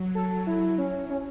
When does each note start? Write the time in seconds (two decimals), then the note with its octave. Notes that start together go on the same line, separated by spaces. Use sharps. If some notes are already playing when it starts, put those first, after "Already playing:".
Already playing: F#3
0.15 A4
0.47 E4
0.78 C#4
1.09 C#4